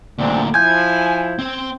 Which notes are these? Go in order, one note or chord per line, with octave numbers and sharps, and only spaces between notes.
D2 A#2 D3 C4 D4
F3 E4 G#5 G6 G#6
C4 C5